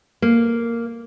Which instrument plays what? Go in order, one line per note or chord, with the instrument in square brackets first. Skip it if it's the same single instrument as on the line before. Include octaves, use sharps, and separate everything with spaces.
[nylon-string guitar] A#3